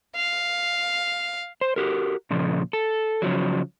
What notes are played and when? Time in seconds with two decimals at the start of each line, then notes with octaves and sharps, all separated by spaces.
0.16 F5
1.61 C5
1.76 F#4 G4 A#4
2.31 A#2 C#3 F3
2.73 A4
3.22 C#3 F3 F#3